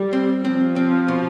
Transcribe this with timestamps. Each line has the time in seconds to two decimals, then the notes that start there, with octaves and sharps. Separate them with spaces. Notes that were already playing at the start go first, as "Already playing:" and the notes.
Already playing: G3
0.13 C4
0.44 F3 C4
0.76 C4
1.08 B2